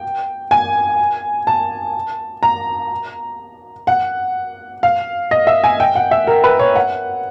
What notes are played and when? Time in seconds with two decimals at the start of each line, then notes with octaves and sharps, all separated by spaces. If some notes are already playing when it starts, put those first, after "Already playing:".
Already playing: G5
0.51 G#5
1.47 A5
2.43 A#5
3.87 F#5
4.83 F5
5.31 D#5
5.47 E5
5.64 G#5
5.80 G5
5.95 F#5
6.11 E5
6.27 A#4
6.44 B4
6.59 C#5
6.76 F#5